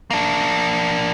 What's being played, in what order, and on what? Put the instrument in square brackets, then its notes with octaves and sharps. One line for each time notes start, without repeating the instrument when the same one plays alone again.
[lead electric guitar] A#3 D4